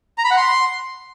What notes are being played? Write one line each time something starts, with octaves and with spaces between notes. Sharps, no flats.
A#5
B5
F#5
C6